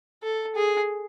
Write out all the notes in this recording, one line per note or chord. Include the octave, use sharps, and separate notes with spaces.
A4
G#4